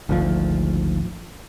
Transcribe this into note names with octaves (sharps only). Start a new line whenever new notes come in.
G#1 D2 F3